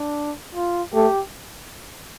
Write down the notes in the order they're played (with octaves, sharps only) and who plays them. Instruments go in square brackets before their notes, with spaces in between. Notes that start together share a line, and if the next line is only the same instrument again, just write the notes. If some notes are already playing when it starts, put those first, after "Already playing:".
Already playing: [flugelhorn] D4
F4
[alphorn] A3 [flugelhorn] G4